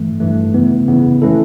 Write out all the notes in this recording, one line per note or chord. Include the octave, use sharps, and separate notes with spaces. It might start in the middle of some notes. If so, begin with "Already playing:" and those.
Already playing: G2 E3 A3
G2 E3 A3
C#3 E3 B3
C#3 E3 B3
E3 A3 C#4 E4 A4